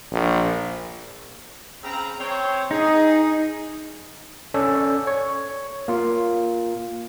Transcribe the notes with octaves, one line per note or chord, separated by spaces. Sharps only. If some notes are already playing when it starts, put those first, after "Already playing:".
A#1
C#3 C4 A#5
C4 C#5
D#4 G#4
C#4 A4 C#5 D5
C#5
A#3 F4